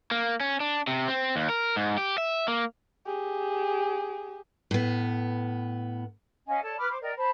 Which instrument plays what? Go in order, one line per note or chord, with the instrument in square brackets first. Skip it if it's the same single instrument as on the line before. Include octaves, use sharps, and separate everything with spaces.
[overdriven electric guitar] A#3
C#4
D4
C3
C4
D#2
A#4
G#2
G4
E5
A#3
[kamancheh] G4 G#4
[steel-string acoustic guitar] A2 B3
[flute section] C#4 D#5 F5 G#5
A4 C#5 D5 A5
B4 B5 D6 F6
C5 D6
A#4 D5 D#5 G5
C5 A5 B5